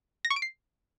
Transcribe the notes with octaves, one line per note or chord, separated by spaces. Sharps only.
A#6
C#6
D7
C7